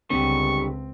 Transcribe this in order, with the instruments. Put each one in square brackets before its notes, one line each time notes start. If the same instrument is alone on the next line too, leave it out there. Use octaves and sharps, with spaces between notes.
[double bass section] C#2 [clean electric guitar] D3 G3 G4 [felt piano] C4 [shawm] C#6